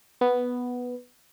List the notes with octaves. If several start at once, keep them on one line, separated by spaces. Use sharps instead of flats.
B3